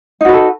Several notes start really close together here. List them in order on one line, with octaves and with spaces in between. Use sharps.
D#4 F#4 B4 A4